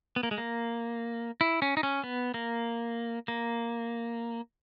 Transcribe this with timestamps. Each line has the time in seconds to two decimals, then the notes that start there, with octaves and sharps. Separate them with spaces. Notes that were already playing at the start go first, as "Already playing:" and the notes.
0.16 B3
0.23 A#3
0.31 G#3
0.38 A#3
1.41 E4
1.62 C#4
1.77 D#4
1.83 C#4
2.04 B3
2.34 A#3
3.28 A#3